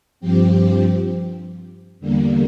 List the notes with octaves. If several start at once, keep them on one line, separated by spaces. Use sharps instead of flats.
G2 F3 C4 G4
E2 D3 G3 A#3